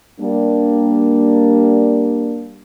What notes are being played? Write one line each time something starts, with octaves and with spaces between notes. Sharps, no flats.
G3 A#3 D4